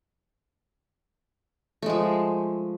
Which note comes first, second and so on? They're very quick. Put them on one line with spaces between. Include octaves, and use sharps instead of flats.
A3 G#3 F3